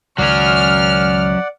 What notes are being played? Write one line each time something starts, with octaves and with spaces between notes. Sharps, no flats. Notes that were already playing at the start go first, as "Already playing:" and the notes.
C#2 D#3 F#3 C#4 D5 F#5 F6